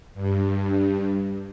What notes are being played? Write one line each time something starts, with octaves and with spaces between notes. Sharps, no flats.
G2